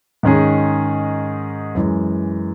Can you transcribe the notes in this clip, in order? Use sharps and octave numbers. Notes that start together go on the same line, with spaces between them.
G#2 D#3 G#3 C#4 G#4
F#2 E3 G#3